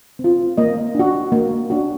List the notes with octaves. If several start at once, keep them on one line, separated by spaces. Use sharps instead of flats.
C4
F4
A#3 D#5
D4 F#4
A#3
D4 F#4